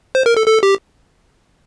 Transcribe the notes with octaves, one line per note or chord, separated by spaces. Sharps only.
C5
A#4
A4
A4
G4